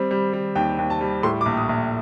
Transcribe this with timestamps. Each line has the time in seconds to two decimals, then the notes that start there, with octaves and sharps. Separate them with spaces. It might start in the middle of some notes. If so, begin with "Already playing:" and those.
Already playing: G3 C4
0.11 G3
0.33 G3
0.55 D#2 G5
0.79 D#2
0.90 A5
1.01 G3
1.23 A2 C6
1.41 D6
1.46 A#1
1.57 D#6
1.69 A#1